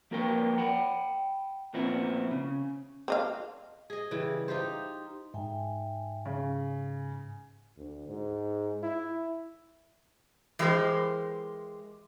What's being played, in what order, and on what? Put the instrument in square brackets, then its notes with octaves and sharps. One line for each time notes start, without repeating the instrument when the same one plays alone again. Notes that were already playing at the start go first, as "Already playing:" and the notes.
[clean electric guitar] F3 A#3 F#4 A#4 B4 G5
F#5 G5 B5
A#2 F3 B3 C4 E4
C#3
[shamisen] C4 D#5 F5
[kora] G#4 D#5
C#3 E3 G3
D#4 F4 G4 C5
[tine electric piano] G#2 [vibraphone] E5 G5 G#5
[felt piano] C#3 [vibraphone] G#5
[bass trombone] D2
G#2
E4
[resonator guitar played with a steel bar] E3 G#3 G4 A#4 C5